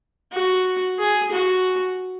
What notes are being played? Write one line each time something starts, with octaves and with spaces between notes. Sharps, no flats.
F#4
G#4
F#4